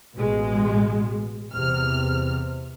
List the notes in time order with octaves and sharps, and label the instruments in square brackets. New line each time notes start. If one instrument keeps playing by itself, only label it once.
[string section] A1 G#3 [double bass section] B2
[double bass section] E2 C3 [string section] F6